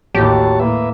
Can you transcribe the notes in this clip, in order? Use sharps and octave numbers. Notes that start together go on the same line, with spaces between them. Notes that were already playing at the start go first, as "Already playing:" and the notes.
A1 D#2 A2 F#4 G4 C#5 A5
A2 A#3 B4 E5